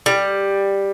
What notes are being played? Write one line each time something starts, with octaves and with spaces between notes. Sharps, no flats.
G3